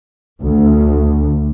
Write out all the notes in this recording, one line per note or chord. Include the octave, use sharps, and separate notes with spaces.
D2